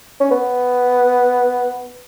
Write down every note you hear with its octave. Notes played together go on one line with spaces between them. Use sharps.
C#4
B3